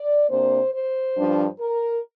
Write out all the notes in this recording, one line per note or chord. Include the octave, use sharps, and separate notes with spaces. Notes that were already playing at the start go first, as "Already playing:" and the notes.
Already playing: D5
C3 A#3 D4 C5
C5
G2 F3 D4
A#4